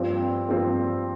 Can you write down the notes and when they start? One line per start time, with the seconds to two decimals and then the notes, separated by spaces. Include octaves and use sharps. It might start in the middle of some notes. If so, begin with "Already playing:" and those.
Already playing: G2 F3 C4
0.48 G2 F3 C4